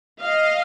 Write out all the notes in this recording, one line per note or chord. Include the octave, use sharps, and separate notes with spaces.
D#5 F5